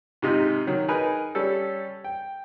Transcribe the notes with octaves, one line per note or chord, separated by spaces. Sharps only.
G#2 C3 D#4 F4
D#3 F#3
D#4 G#4 A#4 B4
G3 C#4 A4
G5